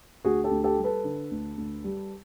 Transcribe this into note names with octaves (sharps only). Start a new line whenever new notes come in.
D2 F#4 G#4
G4 A4
D2
G4 A4
G3
A4 B4
D3
D2
D2
G3